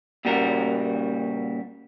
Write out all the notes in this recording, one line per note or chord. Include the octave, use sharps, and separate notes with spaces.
A#2 C#3 G3 F#4 A#4